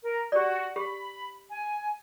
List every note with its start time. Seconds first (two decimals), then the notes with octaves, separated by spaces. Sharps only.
0.03 A#4
0.32 F#4 G4 D5
0.76 G4 B5
1.50 G#5